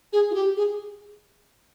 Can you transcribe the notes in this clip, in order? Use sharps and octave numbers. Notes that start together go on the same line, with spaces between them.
G#4
F4
G4
G#4